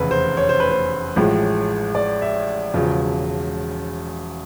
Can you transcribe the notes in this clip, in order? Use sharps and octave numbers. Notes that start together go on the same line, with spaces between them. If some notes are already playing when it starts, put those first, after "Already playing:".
Already playing: F1 E2 C#3 B4
C5
C#5
C5
B4
C5
A1 A2 F3 G#3
D5
E5
E1 E2 C#3 F3